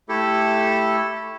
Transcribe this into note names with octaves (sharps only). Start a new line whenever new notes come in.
A3 E4 G4 A4